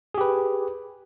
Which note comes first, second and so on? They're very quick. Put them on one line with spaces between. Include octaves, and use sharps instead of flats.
G#4 G4 B4